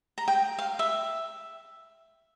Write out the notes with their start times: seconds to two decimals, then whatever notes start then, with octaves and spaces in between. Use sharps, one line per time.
0.18 A#5
0.28 G5
0.59 F5
0.79 E5